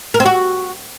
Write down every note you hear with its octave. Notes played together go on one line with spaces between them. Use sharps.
A#4
C4
F#4